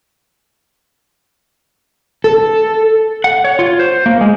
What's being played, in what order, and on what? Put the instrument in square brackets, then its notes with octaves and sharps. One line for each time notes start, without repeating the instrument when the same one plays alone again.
[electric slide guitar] A4
F#5
C#5
F4
C5
A#3
G#3